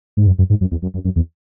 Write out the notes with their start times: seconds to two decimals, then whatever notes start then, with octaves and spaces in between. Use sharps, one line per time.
0.17 G#2
0.27 F#2
0.39 F#2
0.50 G#2
0.61 F#2
0.71 E2
0.82 F#2
0.94 F#2
1.05 F#2
1.16 E2